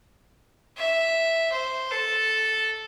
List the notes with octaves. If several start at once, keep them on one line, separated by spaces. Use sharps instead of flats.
E5
C5
A4